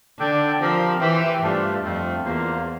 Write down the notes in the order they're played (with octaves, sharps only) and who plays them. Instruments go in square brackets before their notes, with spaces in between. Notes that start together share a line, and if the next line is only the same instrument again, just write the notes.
[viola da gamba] D3 [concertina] D4 A4 D5 G5
[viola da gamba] F3 [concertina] C4 G4 A#4
[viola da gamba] E3 [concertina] G4 C5 E5 G5
[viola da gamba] G2 [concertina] A3 D4 F4 A4 C5
[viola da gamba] F2 [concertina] A3 C4 F4
[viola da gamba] E2 [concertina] A#3 F4 C5